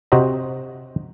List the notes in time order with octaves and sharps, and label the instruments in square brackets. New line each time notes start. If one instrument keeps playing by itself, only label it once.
[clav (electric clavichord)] C3 C4 F#4 C5 D#5 A#5